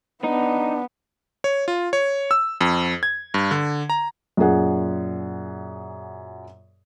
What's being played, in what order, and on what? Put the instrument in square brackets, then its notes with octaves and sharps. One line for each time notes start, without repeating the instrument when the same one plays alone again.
[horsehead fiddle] B3 [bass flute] D4 [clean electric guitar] D#4
[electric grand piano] C#5
F4
C#5
E6
F2
G#6
G2
D3
A#5
[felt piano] F#2 A#2 G#4 F#5